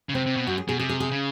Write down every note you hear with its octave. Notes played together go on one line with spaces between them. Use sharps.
C#3
C3 C4
C3
B2
F#2 F#4
G#4
B2 G#4
C3 G#4
G#4
G#4
C#3